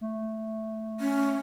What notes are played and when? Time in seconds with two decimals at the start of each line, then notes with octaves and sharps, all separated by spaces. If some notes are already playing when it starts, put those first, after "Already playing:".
0.01 A3
1.00 C#4